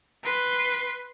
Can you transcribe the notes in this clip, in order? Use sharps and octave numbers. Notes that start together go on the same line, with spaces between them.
B4 C6